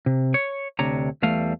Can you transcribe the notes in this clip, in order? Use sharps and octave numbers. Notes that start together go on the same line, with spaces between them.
C3
C#5
D2 C3 D4 C#5 A#5
E2 E3 G3 A3 F5